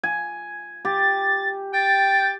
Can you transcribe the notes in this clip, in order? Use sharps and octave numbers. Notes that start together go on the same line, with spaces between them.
G#5
G4 A6
G5 A6